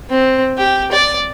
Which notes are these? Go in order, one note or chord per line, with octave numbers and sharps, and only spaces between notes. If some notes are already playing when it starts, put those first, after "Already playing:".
C4
G4
D5